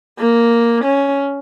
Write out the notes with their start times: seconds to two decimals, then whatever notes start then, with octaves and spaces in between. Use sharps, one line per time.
0.19 A#3
0.84 C#4